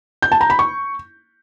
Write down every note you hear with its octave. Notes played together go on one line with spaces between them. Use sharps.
G6
A5
A#5
B5
C#6